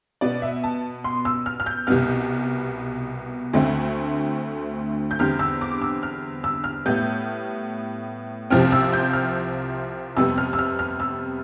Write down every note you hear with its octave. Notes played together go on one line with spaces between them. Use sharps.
B2 B3 D5
E5
A5
C6
E6
F6
F6
G6
C2 B2 G3 B3 F6
D2 D3 A3 C4
G6
E2 D3 G3 C4 F6
E6
D6
E6
F6
E6
F6
A2 G3 B3 G6
C2 C3 F3 C4 F6
E6
G6
F6
F2 C3 G3 B3 E6
F6
E6
F6
F6
E6